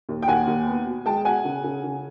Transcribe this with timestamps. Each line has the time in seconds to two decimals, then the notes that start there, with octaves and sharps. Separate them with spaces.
0.09 D#2
0.22 G5
0.28 D#2 F#5 G#5
0.47 D#2
0.67 B3
0.86 B2
1.06 G#3 G5 A5
1.25 B2 F#5 G#5
1.45 C#3
1.64 C#3
1.84 C#3